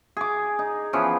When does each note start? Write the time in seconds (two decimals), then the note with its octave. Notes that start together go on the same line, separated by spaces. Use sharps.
0.17 G#4 D6
0.59 D#4
0.93 E3 F3 B3 C#4